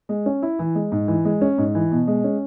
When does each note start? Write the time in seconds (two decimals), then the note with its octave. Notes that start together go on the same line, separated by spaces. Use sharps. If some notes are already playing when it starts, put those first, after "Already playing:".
0.09 G#3
0.26 C#4
0.42 E4
0.59 E3
0.75 G#3
0.92 G#2
1.08 E3
1.25 G#3
1.41 C#4
1.58 G#2
1.75 E3
1.92 B2
2.07 G#3
2.24 C#4